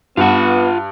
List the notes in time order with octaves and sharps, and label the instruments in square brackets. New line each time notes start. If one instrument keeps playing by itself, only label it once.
[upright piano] G2 [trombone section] B3 [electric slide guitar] F4 F#5